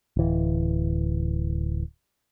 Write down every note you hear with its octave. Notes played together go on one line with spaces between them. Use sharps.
D1 E3